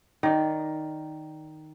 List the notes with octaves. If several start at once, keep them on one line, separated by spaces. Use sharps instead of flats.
D#3 D5